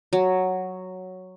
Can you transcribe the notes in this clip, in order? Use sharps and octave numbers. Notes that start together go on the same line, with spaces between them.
F#3